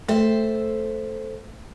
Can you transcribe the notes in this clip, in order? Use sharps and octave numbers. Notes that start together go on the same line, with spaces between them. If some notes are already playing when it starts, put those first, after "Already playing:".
A3 A4 C5 E5